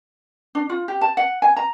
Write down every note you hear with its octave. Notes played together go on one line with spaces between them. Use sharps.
D4
F4
G4
A5
F#5
G#5
A#5